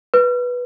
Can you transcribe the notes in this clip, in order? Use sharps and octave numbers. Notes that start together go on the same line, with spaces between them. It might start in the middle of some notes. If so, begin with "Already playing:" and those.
B4